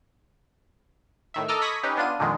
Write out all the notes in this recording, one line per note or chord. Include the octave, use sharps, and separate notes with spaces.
A2 D#3 E5
A4 D#5 A#5 D6 E6 F6
B5 C#6 D#6 G#6 A#6 B6
C#4 D#4 G4 B4
B3 D4 F4 D#7
F2 A#2 D3 D#3 G#3